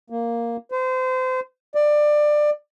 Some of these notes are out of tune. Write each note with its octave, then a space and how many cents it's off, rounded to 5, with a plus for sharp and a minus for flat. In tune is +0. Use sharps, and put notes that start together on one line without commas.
A#3 +0
C5 -30
D5 +20